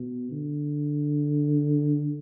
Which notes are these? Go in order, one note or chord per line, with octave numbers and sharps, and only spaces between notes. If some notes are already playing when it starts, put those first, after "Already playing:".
Already playing: B2
D3